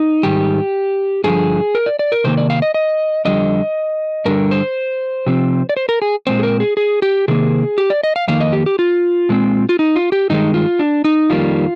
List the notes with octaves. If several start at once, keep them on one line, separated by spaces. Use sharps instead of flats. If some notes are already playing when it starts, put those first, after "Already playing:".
Already playing: D#4
G#2 D#3 G3 G4
G2 D3 F3 G#4
A#4
D5
D5
A#4
C3 D#3 A#3 C5
D5
F5
D#5
D#5
F2 D3 G3 D#5
G2 D3 G3 A#4
C5
C3 F3 C4
D5
C5
A#4
G#4
A#2 G#3 C4 C5
G#4
A#4
G#4
G#4
G4
C3 D#3 A#3 G#4
G4
D5
D#5
F5
F2 D#3 A#3 F5
D#5
G4
G4
F4
A#2 G#3 C4
F4
D#4
F4
G4
G2 D#3 G#3 D#4
F4
D4
D#4
F2 D#3 G3 A#3 F4